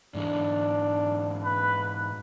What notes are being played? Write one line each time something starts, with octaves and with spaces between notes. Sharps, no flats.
G#2 E3 G#3 D4
B4